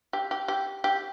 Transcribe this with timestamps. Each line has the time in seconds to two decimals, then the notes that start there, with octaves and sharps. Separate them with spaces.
0.13 G4
0.31 G4
0.48 G4
0.84 G4